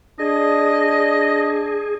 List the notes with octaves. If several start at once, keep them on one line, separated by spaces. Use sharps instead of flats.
D4 G#4 D#5